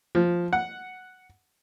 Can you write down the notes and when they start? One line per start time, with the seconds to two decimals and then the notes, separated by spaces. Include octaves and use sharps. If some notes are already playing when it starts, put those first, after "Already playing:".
0.15 F3
0.53 F#5